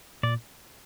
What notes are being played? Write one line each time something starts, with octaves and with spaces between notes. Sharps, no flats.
A#2 D5